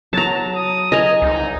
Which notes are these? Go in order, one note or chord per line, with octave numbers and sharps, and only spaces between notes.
F#3 A5 A#5
D#6
D#5 G#5 A#5
C2 D#4